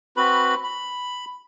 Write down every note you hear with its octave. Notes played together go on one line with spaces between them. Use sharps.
C4 F#4 B4 B5
B5